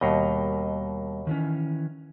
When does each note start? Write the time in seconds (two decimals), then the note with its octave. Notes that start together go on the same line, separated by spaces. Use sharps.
0.01 D#2 B2 G3 A#4 D#5
1.27 D#3 E3 C#4